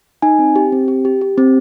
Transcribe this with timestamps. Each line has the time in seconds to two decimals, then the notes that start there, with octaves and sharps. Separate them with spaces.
0.22 D#4 G#5
0.39 C4
0.56 G4
0.72 C4
0.88 G4
1.05 G4
1.21 G4
1.38 C4